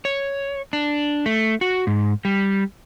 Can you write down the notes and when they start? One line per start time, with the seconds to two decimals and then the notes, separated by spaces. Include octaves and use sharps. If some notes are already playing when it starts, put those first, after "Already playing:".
0.05 C#5
0.73 D4
1.26 A3
1.61 F#4
1.87 G#2
2.25 G3